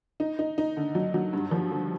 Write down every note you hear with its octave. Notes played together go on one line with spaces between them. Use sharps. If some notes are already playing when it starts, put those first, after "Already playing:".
D#4
D#4
D#4
D3
F#3
F#3
G2
F3
D3